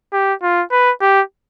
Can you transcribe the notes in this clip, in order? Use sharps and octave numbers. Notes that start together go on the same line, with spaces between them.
G4
F4
B4
G4